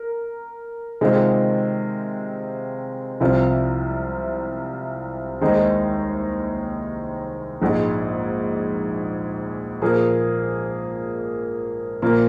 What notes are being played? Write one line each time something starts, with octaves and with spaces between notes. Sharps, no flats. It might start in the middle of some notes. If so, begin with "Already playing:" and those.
Already playing: A#4
C3 D#3 G#3 C4 F4
C2 C3 F3 C4 F4
D#2 D#3 G#3 D#4 C5
A#1 G#2 G#3
A#2 F3 A#3 G#4
A#2 F3 A#3